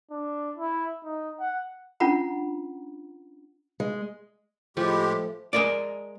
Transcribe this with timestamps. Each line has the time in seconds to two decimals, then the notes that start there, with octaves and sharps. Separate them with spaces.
0.11 D4
0.57 E4
1.04 D#4
1.40 F#5
2.00 C#4 D4 F4 F#5 A#5 B5
3.80 G#3
4.77 A2 F3 G#3 A3 G4
5.53 G#3 A#4 D5